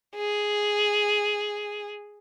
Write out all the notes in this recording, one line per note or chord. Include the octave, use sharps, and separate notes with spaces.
G#4